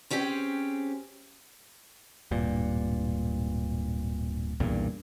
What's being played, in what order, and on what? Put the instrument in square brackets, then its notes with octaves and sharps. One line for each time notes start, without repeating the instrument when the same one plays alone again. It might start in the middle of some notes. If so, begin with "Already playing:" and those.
[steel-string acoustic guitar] C4 C#4 G4 G#4 C5
[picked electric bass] D1 G2 A#2
B1 E2 G2 A#2